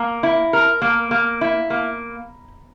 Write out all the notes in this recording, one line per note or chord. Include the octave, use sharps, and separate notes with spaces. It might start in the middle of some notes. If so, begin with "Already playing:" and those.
Already playing: A#3 A#5
E4
A#4
A#3
A#3
E4
A#3